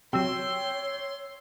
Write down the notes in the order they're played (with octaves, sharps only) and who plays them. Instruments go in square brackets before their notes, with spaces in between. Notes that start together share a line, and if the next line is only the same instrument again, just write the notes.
[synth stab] C3 F#3 [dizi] C#5 [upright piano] G5 E6 [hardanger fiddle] C6